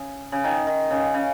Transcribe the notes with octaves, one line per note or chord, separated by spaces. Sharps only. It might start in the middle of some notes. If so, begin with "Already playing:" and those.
Already playing: C#3
C#3
D#3
D#3
C#3
C#3